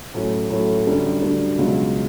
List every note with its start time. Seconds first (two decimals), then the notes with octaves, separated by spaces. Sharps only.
0.14 A2 F#3 C#4
0.50 A2 F#3 C#4
0.87 F#2 D3 G3 D4
1.22 F#2 D3 G3 D4
1.58 C#2 B2 F#3